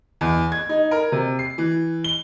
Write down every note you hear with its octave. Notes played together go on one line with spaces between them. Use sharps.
E2
G#6
D#4
A#4
C3
C7
E3
G7